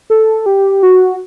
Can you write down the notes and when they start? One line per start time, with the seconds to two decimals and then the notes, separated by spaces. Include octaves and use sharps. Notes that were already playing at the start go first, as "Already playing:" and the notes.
0.10 A4
0.46 G4
0.83 F#4